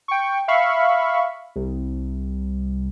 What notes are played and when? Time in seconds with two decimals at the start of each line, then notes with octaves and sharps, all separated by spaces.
0.08 G5 C#6
0.48 E5 F5 B5 C#6
1.56 C2